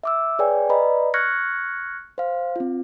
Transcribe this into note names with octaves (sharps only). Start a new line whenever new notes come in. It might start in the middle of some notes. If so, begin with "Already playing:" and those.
E5 D6 E6
G#4 B4 C#5 D5 G5 G#5
B4 D5 D#5 A#5 B5
C#6 F6 F#6 G#6 A#6 C#7
C5 F5
C4 F4